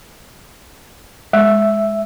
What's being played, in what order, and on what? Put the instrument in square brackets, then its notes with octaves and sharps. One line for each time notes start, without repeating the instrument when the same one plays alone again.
[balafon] G#3 [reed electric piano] E5